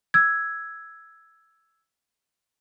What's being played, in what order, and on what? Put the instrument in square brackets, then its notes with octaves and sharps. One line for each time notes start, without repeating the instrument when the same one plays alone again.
[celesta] E6 G#6